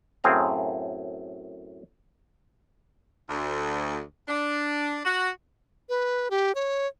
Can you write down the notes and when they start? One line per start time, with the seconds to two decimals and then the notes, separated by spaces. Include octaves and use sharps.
0.24 F#2 A2 C4 G#4 F5 A#5
3.29 D2
4.29 D4
5.05 F#4
5.89 B4
6.31 G4
6.55 C#5